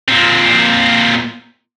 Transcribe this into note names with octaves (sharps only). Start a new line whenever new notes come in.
A#2 C4